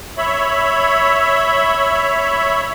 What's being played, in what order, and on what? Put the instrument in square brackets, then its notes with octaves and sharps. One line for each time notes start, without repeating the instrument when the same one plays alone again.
[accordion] C#5 E5 B5